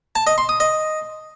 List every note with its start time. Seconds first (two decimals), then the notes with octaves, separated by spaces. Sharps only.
0.16 A5
0.27 D#5
0.38 C6
0.49 D#6
0.60 D#5